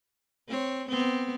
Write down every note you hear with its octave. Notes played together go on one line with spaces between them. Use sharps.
C4 C#5
B3 C4